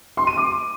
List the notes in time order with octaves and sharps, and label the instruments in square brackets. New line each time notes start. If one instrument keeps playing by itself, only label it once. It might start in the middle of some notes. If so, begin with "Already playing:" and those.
[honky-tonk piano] C6
D#7
D6